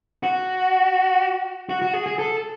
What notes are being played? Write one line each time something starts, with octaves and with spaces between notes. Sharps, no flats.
F#4
F#4
F#4
G#4
G#4
A4